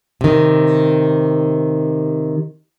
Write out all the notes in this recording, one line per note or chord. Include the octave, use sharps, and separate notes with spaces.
C3 D#3